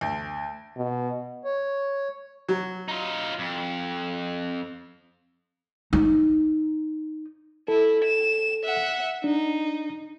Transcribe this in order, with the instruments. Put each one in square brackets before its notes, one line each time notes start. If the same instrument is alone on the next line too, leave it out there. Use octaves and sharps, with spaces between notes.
[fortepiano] D2
[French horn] B2
[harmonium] C#5
[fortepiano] F#3
[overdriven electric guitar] D#4 F4
F2
[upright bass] D#4
[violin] E4 [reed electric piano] A4
[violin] E7
E5 F#5
[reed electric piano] D4 [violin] D#4